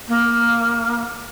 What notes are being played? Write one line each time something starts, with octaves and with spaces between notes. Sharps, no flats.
A#3